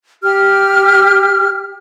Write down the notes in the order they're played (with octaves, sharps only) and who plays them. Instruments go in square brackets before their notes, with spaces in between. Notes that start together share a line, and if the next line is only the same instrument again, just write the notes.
[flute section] G4 F6